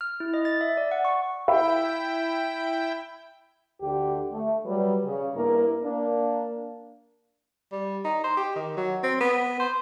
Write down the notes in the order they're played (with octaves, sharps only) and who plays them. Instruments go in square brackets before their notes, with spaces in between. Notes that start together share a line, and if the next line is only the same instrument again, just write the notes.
[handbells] F6
E4
D#5
A6
E5
D5
F#5
C#6
[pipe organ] E4 G5 [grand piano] E5 B5
[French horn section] D2 D3 G4
A3
F#3 G3 B4
C#3
G2 A#3 E4 A#4
A#3 D4
[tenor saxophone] G3
D#4
C5
G4
D#3
F#3
C4
B3
C5